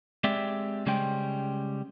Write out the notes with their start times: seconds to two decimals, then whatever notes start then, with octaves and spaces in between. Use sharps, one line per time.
0.24 G#3 C4 G4 D5 E5
0.86 C#3 G3 G#3 C#4 C5 G5